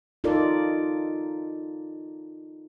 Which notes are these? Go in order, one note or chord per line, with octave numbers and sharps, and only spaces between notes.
D#4 F4 A4 A#4 D5